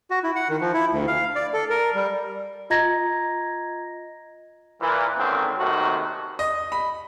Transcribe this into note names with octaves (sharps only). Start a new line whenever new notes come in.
F#4
E4
F#5
D#3
F3
E4
D2
F5
D5
A4
A#4
G3
F4 D#5 A#5 G#6 A#6
A#2 E3
G#1 D3 D#3 C4 C#4
D#2 C3 D#3 A3 F#4
D#5
B5